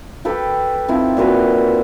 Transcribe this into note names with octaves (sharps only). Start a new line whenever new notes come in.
G4 A4 B4 G5
F3 C4 D#4 E4
A#2 F#4 B4 C6